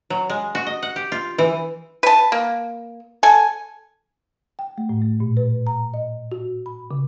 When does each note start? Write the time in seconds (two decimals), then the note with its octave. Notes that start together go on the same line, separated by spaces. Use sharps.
0.10 F#3
0.30 G#3
0.55 F#4
0.67 D#5
0.82 F#5
0.96 G4
1.12 F4
1.38 E3
2.03 B4 A5
2.32 A#3
3.23 A4 G#5
4.59 G5
4.78 A3
4.89 A2
5.02 A3
5.20 A#2
5.37 B4
5.67 A#5
5.94 D#5
6.32 F#4
6.66 B5
6.91 C#3